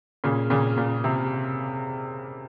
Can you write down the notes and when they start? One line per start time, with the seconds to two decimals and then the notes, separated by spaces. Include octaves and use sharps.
0.24 A#2 C#3
0.50 A#2 C#3
0.78 A#2
1.04 C3